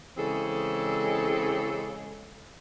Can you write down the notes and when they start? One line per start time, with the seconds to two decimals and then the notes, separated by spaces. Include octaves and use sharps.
0.17 C#3 E3 G#3 C4 G#4 A4